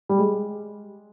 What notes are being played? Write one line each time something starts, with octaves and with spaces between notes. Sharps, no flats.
G3
G#3